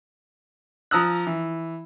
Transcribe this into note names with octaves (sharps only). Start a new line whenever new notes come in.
F3 A#5 D#6 E6 F#6
E3